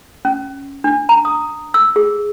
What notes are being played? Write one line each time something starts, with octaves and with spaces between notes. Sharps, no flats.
C#4
D4
A#5
D#6
E6
G#4